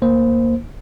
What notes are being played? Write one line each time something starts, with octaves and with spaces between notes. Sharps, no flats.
D2 A#3 C5